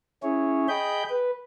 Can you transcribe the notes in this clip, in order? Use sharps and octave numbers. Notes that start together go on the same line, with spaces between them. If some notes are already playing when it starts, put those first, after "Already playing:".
C#4 E4 G#4 C#5
G#4 D#5 G5 B5 G6
B4